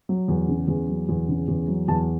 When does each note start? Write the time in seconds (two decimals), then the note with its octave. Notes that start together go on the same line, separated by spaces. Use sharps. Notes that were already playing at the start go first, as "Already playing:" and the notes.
0.09 F#3
0.28 E2
0.48 C#3
0.68 E2
0.89 F#3
1.09 E2
1.28 C#3
1.48 E2
1.68 F#3
1.88 E2 A5